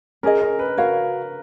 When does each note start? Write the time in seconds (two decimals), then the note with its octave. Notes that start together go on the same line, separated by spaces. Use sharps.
0.23 C#4 G#4 A#4 D#5
0.42 A#4
0.59 B4
0.77 F#4 A#4 C#5 F5